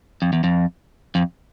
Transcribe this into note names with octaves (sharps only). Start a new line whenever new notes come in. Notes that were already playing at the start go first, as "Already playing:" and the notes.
F2
E2
F2
F2